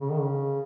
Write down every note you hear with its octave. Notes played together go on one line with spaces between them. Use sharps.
C#3
D#3
C#3